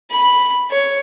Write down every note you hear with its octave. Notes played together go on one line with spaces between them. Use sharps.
B5
C#5